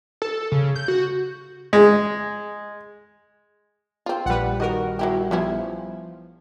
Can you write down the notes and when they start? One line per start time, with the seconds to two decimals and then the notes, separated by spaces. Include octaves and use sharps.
0.22 A4
0.52 C#3
0.76 G6
0.88 F#4
1.73 G#3
4.06 C4 F4
4.26 A#1 G3 B4 F#5
4.60 D#3 F#4 A#4 D#5
4.99 F#3 E4 G4
5.31 F3 B3 C#4 E4